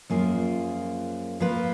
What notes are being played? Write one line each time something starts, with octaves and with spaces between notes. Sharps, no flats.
F#2 F3 A#3 F4 G#4
F3 A#3 F4 B4